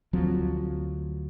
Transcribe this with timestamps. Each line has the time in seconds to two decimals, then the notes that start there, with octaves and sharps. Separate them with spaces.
0.13 D2 F3 F#3 C4